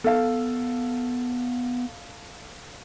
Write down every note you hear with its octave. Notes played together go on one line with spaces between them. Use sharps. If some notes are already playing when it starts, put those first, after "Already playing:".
B3 A4 F5